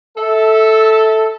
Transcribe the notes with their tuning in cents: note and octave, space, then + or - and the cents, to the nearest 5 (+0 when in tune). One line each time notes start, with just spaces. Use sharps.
A4 +0 E5 -20